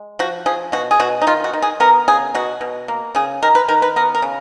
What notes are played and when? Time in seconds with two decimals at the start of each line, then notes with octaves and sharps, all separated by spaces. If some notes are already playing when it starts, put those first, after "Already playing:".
Already playing: G#3
0.19 F3 F#4
0.46 F3 G#4
0.72 B2 F#4
0.91 G#4
1.00 B2 F#4
1.22 D#4
1.27 D#3 F4
1.44 F#4
1.53 D#3
1.62 G#4
1.80 B3 A#4
2.08 C#3 G#4
2.34 B2 F#4
2.61 B2
2.88 A#3
3.15 C#3 G#4
3.43 D#3 A#4
3.55 B4
3.68 D#3 A#4
3.82 B4
3.96 B3 A#4
4.15 A#4
4.22 C#3